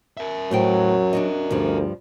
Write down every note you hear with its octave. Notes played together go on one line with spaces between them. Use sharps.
A#4 E5
A2 F#3 C5 G5
D4 F#4 D#5
D2 G2 F3 G3